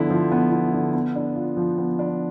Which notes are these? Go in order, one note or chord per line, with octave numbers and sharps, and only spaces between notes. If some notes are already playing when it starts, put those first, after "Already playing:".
Already playing: D3 F3 B3 E4
F3
B3
E4
D3
B3
D4
F4
F3
B3
D4